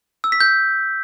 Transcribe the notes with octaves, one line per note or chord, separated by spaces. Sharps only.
E6
B6
G6